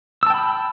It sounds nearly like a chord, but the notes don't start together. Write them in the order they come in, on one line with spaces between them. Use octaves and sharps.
E6 A5 G5 B5